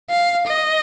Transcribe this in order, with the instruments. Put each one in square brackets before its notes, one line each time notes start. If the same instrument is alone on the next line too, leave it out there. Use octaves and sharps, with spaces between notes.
[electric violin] F5
D#5